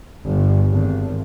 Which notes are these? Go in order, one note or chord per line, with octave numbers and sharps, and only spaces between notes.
G1
G#1